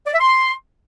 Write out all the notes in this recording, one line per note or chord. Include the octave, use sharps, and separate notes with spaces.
D5
E5
C6